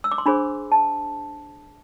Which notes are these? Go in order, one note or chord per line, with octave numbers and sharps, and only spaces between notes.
E6
D6
C6
D4 G#4 C5 B5
A5